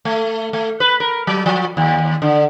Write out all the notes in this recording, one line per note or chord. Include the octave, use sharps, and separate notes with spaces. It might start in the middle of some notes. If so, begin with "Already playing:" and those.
A3
A3
B4
A#4
F#3
F3
D#2
D3